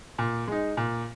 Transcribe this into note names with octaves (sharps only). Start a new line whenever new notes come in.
A#2
G#3 D#4
A#2